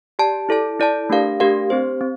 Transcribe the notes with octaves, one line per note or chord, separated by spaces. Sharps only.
G4 D5 A5
E4 A4 D5 A5
E4 A4 D5 A5
A3 D4 G4 A#4 F5
A3 D4 G4 A#4 F5
C4 G4 C5
C4